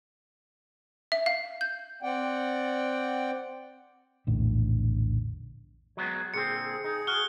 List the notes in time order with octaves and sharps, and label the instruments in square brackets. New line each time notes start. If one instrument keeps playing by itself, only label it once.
[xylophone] E5
F5
G6
[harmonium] C4 D5 F#5 G5
[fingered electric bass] A#1 E2 A2 D3
[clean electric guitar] F#3 G#3 B3
[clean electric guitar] A#2 D3 C4 [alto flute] G#4 [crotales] C#7
[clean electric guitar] D#4 [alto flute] G#4
[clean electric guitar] F#4 [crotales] F6 F#6 G7